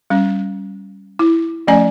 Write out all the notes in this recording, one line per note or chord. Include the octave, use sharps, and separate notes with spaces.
G3 C#4
E4
F3 A3 C#4 D5 G#5